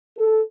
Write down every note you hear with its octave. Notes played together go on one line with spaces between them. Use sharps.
A4